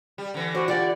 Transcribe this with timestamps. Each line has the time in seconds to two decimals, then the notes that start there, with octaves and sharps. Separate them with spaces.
0.18 G3
0.34 D3 E3
0.55 F#4 C5
0.68 F4 G4 D5 F#5